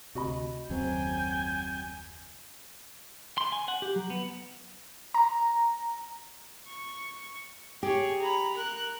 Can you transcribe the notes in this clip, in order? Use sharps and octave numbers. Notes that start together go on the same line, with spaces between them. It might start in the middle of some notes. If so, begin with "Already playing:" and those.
D2 C3 F#4 D#5 B5
F#1 D#2 C#3 F#3 C4 G5 G#5
C6
G#5
F#5
G4
F#3
B3
A#5
C#6
G4 G#4 C#5
A#5 B5
A#4 F#6